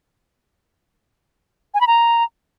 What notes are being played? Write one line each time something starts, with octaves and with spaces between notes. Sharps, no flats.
G#5
B5
A#5